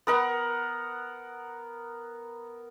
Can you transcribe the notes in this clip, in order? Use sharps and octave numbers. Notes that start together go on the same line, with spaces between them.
B3 A#4 F#5